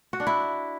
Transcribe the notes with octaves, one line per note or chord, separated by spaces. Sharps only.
F#4
D4
E4